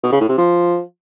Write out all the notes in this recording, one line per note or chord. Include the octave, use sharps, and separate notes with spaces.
B2
C#3
A2
C3
F3